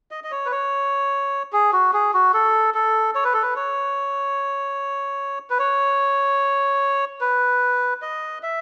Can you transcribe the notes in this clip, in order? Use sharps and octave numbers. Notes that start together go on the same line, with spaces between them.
D#5
D#5
C#5
B4
C#5
G#4
F#4
G#4
F#4
A4
A4
C#5
B4
A4
B4
C#5
B4
C#5
B4
D#5
E5